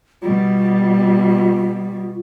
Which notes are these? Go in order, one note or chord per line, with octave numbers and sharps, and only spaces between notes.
B2 G3 F4